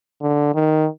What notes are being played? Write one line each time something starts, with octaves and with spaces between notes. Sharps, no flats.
D3
D#3